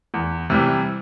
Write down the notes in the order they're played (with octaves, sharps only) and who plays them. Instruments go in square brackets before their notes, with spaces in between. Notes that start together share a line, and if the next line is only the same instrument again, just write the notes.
[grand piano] E2
C3 E3 G3